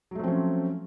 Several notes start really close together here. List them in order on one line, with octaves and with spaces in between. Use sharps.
F#3 A3 F3 C4 C#4